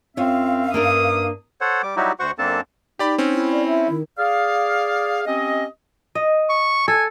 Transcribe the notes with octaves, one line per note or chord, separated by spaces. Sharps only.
F#2 C4 F4 C5 C#5 E5 F5
G2 A#3 D4 A#4 D#6
A4 C5 C#5 F#5
G3 D6
F#3 G3 D#4 E4 F#4 G4
D2 F#4 C5 F#5 C#6
F#2 A#3 C4 D4 A4 A5
D#4 G4 D5 B5
C4 C#4
E4
D5
E5
D#3
G#4 D5 F5
C4 C#4 G4 D#5
D#5
C#6
A4 G#5